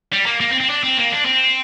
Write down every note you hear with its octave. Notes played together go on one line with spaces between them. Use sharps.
G3
A#3
A#3
C4
C4
D4
C4
A#3
D4
C4